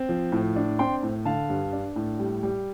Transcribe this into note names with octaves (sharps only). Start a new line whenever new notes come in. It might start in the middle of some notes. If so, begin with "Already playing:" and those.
Already playing: C4
F3
A2
D4
C4 G5 C6
A2
D3 F5 A5
G2
D4
A2
G3
G3